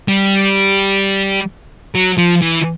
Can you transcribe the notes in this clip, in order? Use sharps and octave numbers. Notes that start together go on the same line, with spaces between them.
G3
F#3
F3
E3